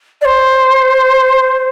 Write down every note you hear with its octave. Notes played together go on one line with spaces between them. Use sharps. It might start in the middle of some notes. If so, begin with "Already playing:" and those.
D5
C5